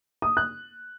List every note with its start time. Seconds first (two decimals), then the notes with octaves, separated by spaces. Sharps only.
0.22 D#6
0.37 F#6